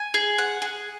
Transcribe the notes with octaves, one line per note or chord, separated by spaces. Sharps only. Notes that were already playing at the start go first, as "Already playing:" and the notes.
Already playing: G#5
G#4
F#5
G#4